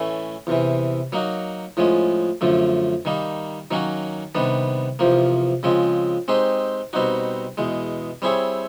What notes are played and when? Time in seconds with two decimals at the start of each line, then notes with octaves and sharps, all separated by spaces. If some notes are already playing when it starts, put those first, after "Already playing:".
Already playing: A2 E3 A3 C#4
0.47 E2 C3 E3
1.12 F#3 A#3 D#4 F#4
1.77 A2 F3 G#3 C#4
2.41 F#2 D3 F3 A3
3.05 D#3 G3 A#3 D#4
3.71 D#3 F#3 A#3 C#4 F#4
4.35 C3 D#3 G3 B3 D4
4.99 E2 C3 F3 A#3
5.63 C#3 F3 G#3 C4
6.28 G#3 C4 D#4 G4 C5
6.93 B2 G3 C4 D#4 F#4
7.58 E2 B2 G#3
8.22 G3 C4 E4 G#4 C#5